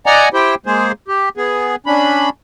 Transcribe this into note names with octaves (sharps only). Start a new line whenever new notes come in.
D5 D#5 F#5 G#5 A#5
E4 G4 C5 G5
G#3 A#3 G#4 C5
G4
B3 G#4
C#4 D4 B5